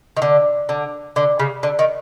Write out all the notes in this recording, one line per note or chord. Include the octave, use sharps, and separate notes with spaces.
D#3
D3
D3
D3
C#3
D3
D#3